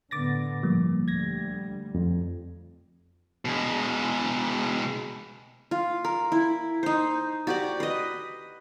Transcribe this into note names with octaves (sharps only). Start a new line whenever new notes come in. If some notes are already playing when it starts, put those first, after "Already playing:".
A2 D3 B3 D6 A6 A#6
G#1 A#2 F3 G3 A#3
D2 G3 G#6 A#6
F2
B2 G#3
F4
A#4
E4
D#4 C5
F#4 G4 D5
B4 D#5